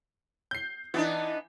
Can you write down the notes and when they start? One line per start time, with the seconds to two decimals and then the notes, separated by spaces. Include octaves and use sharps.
0.51 G6 C7
0.94 E3 B3 D4 D#4